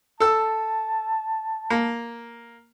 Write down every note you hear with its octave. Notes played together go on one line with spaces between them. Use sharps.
A4 A5 E6
A#3